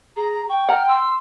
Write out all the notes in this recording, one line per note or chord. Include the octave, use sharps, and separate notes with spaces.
G#4 A#5
G5 C#6
F#5 A#5 F6
C6 E6